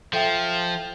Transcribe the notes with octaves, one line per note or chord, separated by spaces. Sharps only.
F3 A4 E5 G5